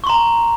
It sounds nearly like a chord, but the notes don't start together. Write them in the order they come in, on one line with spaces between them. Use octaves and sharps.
C#6 C6 A#5